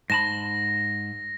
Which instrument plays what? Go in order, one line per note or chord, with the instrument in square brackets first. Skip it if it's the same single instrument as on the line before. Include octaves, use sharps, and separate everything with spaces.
[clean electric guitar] G#2 A5 B5 [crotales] A#6